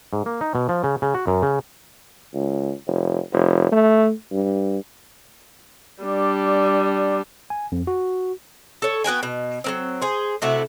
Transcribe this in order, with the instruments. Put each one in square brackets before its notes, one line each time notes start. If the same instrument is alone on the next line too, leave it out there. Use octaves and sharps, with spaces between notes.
[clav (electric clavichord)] G#2
A#3
D#4
B2
F3
C#3
C#3
F#4
F#2
C#3
[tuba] C#2
F1
F1
A3
G2
[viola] G3 D4
[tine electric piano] G#5
F2
F#4
[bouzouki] A4 C#5
B3 F#4 G5 G#5
B2
F#3 A#3 C4
G#4 C5
C3 A3 E4 F#4